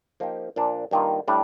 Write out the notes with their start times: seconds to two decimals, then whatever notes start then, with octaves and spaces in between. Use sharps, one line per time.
0.20 F3 A#3 D#4 G4
0.56 A#2 F3 A#3 D4
0.91 G2 D#3 A#3 F4
1.28 A2 G3 D4